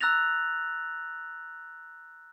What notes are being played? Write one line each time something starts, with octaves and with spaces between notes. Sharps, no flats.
A#5 E6 F#6 A6 A#6 F7